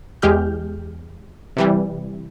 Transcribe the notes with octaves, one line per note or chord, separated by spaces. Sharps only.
E2 G#3 G4 G#4 F6 G6
C3 E3 G3